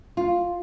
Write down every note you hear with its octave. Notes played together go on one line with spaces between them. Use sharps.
F4